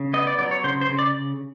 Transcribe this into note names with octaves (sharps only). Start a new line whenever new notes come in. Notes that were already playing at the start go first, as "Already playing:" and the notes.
Already playing: C#3
B3 D#5
D5
F#3 D5
C#5
C#3 C5
C5
C#3
D5